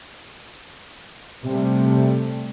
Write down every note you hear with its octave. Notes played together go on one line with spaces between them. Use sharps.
C3 G3 A3